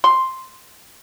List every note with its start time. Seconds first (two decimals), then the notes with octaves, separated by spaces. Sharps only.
0.04 C6